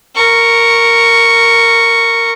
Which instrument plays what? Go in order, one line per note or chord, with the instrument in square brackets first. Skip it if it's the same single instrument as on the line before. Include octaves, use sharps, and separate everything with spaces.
[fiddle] A#4 C#6